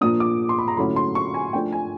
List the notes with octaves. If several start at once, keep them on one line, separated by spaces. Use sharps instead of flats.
A#2 F3 A#3 D4 D#6
D6
C6
B5
A#5
D3 F#3 A3 C#4 E4 B5
C6
C#6
G#5
F3 A3 D4 G5
G#5